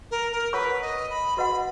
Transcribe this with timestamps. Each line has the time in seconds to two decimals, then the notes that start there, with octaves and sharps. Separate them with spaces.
0.11 A#4
0.32 A#4
0.53 F4 A#4 B4 C#5 F#5 C#6
0.81 D#5
1.10 B5
1.37 F#4 B4 D#5 F#5 B5